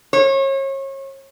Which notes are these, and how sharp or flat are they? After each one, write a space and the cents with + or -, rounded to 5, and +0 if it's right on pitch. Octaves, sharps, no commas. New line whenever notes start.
C#5 -35